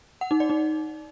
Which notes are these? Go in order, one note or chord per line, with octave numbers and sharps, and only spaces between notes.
F#5
D#4
D5
D#4